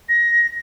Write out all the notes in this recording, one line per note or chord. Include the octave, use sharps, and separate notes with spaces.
A#6